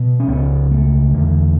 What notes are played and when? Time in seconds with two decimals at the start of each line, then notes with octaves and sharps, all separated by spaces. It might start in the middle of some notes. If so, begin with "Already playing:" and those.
Already playing: B2
0.20 C#4
0.28 C#2 C#3 B3
0.71 A3
1.14 E2 D3